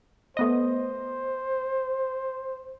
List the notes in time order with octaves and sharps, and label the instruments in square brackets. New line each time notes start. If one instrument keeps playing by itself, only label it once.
[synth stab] A3 B3 D#5 [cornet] C5